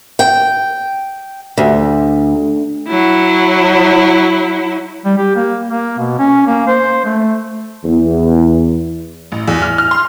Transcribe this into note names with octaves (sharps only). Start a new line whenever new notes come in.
G5
D2
F#3 E4
G3
G4
A#3
A#3
B2
C#4
A#3
C5
A3
E2
A1
E2
F6
F6
C6